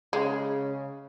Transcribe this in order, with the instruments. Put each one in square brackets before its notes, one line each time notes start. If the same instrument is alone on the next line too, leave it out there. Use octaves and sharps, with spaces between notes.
[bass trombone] C#3 [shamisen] G#3